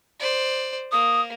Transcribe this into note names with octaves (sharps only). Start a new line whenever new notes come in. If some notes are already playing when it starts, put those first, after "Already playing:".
C5 D5
A#3 D#6